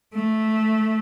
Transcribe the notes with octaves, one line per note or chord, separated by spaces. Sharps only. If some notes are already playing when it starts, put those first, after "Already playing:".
A3